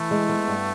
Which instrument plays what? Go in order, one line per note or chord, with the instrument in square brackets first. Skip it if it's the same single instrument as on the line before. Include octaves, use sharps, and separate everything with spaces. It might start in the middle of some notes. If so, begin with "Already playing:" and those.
Already playing: [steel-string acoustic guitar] E3 [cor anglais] A3
[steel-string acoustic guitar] G#3
B3
G2